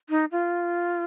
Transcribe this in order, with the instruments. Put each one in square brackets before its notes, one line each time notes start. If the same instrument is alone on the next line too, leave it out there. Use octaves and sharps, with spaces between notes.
[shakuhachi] D#4
F4